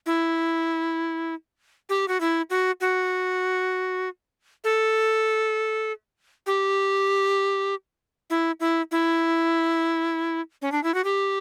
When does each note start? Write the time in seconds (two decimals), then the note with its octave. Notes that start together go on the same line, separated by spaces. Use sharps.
0.06 E4
1.89 G4
2.08 F#4
2.20 E4
2.50 F#4
2.81 F#4
4.64 A4
6.46 G4
8.30 E4
8.60 E4
8.91 E4
10.62 C#4
10.72 D4
10.83 E4
10.94 F#4
11.04 G4